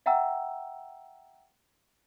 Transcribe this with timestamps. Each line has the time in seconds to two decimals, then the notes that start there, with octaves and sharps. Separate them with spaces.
0.06 E5 F#5 G5 A#5 E6